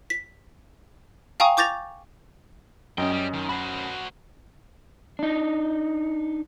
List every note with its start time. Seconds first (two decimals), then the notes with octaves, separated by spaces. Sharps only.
0.10 B6
1.40 F5 G5 G#5 A#5 C#6 D#6
1.57 C#6 D6 G6 A6 A#6 F7
2.98 F#2 F#3 C#4 D#5 G5 D#6
3.11 G3
3.33 D#3
3.49 F#4 C5 B5
5.19 D4 D#4